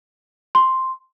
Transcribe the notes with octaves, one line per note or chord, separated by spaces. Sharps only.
C6